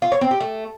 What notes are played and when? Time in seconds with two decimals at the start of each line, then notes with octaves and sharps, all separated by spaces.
0.02 F4
0.12 C#5
0.21 C4
0.31 G4
0.41 A3